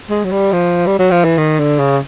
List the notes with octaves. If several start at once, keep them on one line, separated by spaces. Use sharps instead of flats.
G#3
F#3
G3
F3
G3
F#3
F3
E3
D#3
D3
C#3